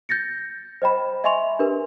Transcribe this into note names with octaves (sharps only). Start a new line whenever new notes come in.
G6 A6 A#6 C#7
C5 D#5 G5 B5
D#5 E5 G#5 C6 C#6 F7
D4 G4 A#4 B4